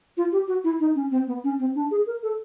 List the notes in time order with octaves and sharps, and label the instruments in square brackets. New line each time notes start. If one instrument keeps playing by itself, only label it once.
[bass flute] F4
G4
F#4
E4
D#4
C#4
C4
B3
C#4
C4
D4
G#4
A#4
A4